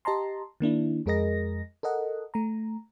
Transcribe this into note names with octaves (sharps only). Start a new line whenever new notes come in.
G4 D#5 A5 A#5 C6
D#3 A#3 D4 E4
F2 G#3 G#4 A#4 D#5 A#6
A4 A#4 D#5 F#5
A3 A#5